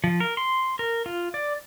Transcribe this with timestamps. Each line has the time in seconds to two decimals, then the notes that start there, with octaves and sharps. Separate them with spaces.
0.04 F3
0.20 A#4
0.37 C6
0.79 A#4
1.06 F4
1.34 D5